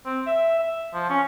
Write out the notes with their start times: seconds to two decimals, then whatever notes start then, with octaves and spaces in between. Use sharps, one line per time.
0.06 C4
0.27 E5
0.59 E5
0.94 F3
1.10 C#4